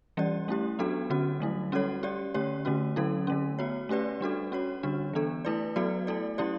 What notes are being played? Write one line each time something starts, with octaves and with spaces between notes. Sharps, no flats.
E3 G3 C#4 G4 D5
A3 C#4 E4 G4
F#3 B3 D4 F#4 A4
D3 G3 C#4 F#4
D3 F#3 A3 E4
G3 C#4 F#4 A4 C#5
C#4 G4 D5
D3 A3 C#4 G4 C#5
D3 A3 C#4 F#4
D3 F#3 C#4 E4 A4
D3 A3 C#4
B3 F#4 C#5
A3 C#4 G4 B4 D5
G3 D4 F#4 A4
C#4 F#4 C#5
D3 G3 D4 F#4
E3 B3 D4 A4
A3 E4 B4 D5
F#3 B3 F#4 A4 D5
A3 E4 A4 D5
F#3 C#4 E4 G4 D5